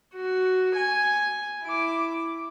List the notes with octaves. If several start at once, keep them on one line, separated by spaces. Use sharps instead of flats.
F#4
G#5
E4 D6